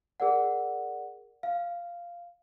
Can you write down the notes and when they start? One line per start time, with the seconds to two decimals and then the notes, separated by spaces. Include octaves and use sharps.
0.20 G#4 A#4 D5 F#5
1.43 F5